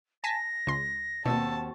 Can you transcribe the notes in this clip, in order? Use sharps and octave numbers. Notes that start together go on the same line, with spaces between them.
G#5 A5 A#6 B6
C#2 C6
D#2 B2 C4 F#4 A5 E6